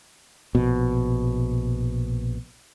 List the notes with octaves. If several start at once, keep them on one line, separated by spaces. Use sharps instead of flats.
A#1 B2